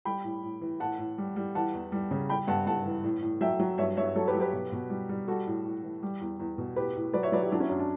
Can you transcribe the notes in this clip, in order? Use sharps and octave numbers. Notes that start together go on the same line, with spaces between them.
G3 G5 B5
A2
A2
E3
A2 F#5 A5
A2
G3
G3
E3 F#5 A5
E2
G3
C#3
G3 G5 B5
G2 F#5 A5
G2 F#5 A5
E3
A2
A2
F#3 E5 G5
F#3
G2 C#5 E5
G2 C#5 E5
F#3 A4 C#5
G4 B4
F#3
G4 B4
B2
B2
G3
G3
G3 F#4 A4
A2
A2
E3
G3
E2
E2
B2
A2 G4 B4
A2
F#3 B4 D5
C#5 E5
F#3 B4 D5
E4 G4
F#3 D4
C#4 E4
F#2 D4
D4